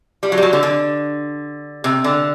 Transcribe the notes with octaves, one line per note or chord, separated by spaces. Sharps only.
G3
F#3
G3
F#3
D3
D3
C3
D3